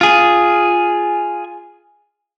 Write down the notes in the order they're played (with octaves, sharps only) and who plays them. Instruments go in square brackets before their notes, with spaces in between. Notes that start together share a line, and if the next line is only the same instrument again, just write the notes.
[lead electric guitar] F4 G#4